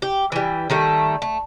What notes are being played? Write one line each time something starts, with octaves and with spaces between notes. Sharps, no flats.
G4
E3 G3
D#3 G3 A3
A3